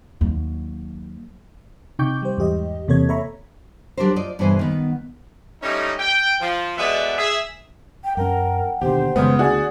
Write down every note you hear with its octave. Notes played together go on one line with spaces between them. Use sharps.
D#2 F#3
C3 D#4 G5 C#6 D6 G6
G3 C5
E2 G#2 G4 D#5
E2 C3 A#3 A4 C#5 G#6
A4 C#5 E5 A#5 B5 C#6
F#3 D4 G4 A4 A#4 C5
F4 C5 D5 D#5
G2 B2 E3 G#4 C5 G#5
D#3 B3
A2 G3 C#4 D#4
G5
F3
B2 G#3 B3 A4 D5 E5
G#4 E5
G5
F#2 C#4 A#4 F#5 G5 A5
D#2 B2 D3 G4 C5
F1 F#2 C#3 G#3 B3 D#6
D2 F#4 G#4 D5